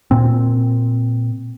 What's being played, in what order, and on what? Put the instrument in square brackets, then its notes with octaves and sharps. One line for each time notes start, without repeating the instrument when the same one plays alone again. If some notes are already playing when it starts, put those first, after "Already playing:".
[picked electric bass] A#2 C4